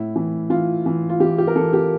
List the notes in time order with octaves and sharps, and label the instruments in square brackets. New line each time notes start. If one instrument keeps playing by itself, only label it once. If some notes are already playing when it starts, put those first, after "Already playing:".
Already playing: [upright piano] A2 E4
E3
E3 F4
E3
F4
E3 G4
G4
A#4
E3 A4
G4